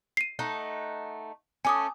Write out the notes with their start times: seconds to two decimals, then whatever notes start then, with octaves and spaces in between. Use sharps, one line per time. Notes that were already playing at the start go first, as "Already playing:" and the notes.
0.17 C7 D#7
0.39 A3 D#4 F#5
1.65 A3 C#4 G#5 D6 D#6